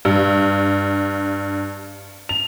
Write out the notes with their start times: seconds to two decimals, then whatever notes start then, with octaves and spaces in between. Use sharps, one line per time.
0.05 G2
2.29 F7